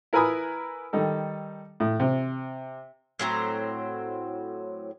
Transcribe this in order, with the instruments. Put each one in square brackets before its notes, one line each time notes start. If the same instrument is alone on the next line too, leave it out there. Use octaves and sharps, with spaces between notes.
[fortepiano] E4 A#4 B4 G#5 B5 D#6
D#3 G3 D#4 A4
A2
C3
[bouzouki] A2 F#3 C4 A#5